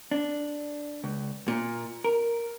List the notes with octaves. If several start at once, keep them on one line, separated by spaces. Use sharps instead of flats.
D4
C#2
A#2
A#4